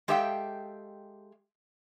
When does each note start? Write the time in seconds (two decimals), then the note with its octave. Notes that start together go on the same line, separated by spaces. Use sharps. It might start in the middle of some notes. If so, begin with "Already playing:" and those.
0.08 G#3 G4 A4 E5 F5 G5